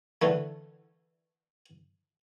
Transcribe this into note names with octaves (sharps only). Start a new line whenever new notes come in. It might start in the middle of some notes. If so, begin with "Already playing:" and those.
D3 E3 A3